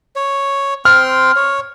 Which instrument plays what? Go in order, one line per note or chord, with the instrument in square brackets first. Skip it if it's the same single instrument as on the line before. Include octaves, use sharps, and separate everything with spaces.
[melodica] C#5
[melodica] C4 G5 C6 [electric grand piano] F6
[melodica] C#5